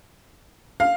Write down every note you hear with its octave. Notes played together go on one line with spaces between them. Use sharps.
F5